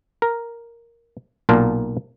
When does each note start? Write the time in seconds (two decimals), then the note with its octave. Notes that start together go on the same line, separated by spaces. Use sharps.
0.22 A#4
1.49 B1 A#2 A#3 F4 A#4 A5